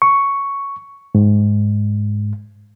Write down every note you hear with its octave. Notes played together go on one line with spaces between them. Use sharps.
C#6
G#2